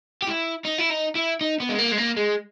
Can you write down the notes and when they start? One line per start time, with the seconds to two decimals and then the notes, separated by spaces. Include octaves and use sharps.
0.22 G4
0.27 E4
0.65 D#4
0.79 E4
0.90 D#4
1.16 E4
1.41 D#4
1.60 B3
1.69 G#3
1.79 A#3
1.92 G#3
1.98 A#3
2.17 G#3